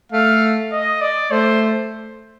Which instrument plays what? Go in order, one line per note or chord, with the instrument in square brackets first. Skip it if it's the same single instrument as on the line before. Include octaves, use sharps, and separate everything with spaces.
[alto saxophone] A3 [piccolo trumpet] F5
[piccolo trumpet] D#5
D5
[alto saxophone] A3 [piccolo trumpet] C5